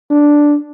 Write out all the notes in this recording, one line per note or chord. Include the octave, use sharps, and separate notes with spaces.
D4